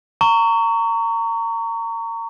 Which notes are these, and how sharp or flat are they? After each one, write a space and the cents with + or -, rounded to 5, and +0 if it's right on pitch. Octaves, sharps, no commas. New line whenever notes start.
A#5 -25 C#6 +20